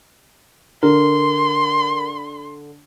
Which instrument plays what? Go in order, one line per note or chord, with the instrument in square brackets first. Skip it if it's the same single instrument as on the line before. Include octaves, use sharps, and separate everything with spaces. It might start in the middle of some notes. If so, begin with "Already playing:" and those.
[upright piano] D3 [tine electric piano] A#4 [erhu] C6